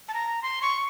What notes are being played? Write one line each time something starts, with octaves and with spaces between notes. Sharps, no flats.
A5
A#5
C6
C#6